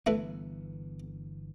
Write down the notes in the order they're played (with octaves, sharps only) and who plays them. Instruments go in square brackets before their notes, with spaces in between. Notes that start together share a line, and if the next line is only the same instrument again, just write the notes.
[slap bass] G1 E3 B3 [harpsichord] A3 E4 B4